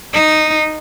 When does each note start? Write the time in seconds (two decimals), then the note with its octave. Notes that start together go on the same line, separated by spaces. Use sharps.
0.13 D#4